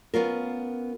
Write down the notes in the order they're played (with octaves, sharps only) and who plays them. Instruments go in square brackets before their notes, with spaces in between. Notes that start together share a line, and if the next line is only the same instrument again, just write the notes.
[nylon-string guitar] B3 C#4 F4 A#4